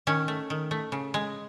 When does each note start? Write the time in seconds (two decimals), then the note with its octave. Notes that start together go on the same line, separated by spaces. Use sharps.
0.07 D#3 C#4
0.28 A3
0.50 D#3
0.71 A3
0.92 C#3
1.14 G#3